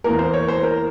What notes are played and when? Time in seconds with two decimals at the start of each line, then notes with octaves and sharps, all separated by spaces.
0.04 E2 E3 A#3 A#4
0.19 C5
0.33 C#5
0.48 C5
0.63 A#4